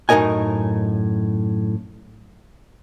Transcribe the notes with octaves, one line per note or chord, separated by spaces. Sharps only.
F#2 A2 D#4 A#4 D#5 G#5